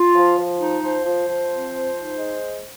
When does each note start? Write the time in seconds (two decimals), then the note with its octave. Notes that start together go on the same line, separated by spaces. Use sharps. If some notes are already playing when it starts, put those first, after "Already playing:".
Already playing: F4
0.15 F3
0.37 F3
0.59 D#4
0.82 F3 C5
1.05 F3
1.28 F3
1.50 C4
1.73 F3
1.96 D#4
2.18 G#3